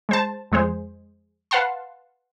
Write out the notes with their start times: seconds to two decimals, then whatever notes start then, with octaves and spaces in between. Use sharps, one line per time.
0.09 G#3 C5 A5
0.52 F2 G#3 G#4 C5
1.51 B4 F5 F#5 A5 C6